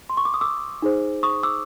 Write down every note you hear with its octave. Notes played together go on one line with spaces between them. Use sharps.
C6
C#6
D6
D#6
D6 E6
D#4 G#4 C5
C#6 D#6
D6 E6